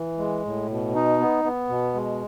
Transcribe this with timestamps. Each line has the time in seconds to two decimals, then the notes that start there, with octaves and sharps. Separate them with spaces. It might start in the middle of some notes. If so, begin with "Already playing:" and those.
Already playing: E3
0.18 G#3
0.45 A2
0.70 B2
0.95 D#4
1.20 B3
1.44 B3
1.69 B2
1.94 G#3